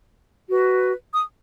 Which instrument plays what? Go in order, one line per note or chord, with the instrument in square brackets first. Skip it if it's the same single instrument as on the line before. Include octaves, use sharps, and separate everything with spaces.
[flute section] F#4 B4
D#6